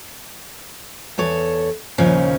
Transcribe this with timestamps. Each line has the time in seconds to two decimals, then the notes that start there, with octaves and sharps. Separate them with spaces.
1.18 E2 A4 C#5
1.98 D#2 A#2 C#3 F3 C#4